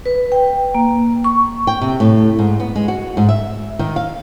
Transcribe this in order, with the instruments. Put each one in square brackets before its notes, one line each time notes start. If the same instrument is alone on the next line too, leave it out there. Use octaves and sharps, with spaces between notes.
[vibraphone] B4
G5
A#3
C#6
[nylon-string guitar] G5
C3
A2
G#2
B3
G#3
F#4
G#2
E5
D#3
F5